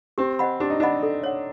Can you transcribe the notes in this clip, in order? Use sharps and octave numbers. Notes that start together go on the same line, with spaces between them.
C4 G4
C5 D#5 F#5 B5
D4 G4
D#4
D4 C5 D#5 F#5 B5
A4
C#5 F#5